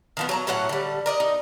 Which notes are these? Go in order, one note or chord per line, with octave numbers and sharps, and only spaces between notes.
D#3 F3 B3
F#3 A5 A#5
A2 F#3 C#4 F#5
D3 G3
A#4 D5 D#5
D#4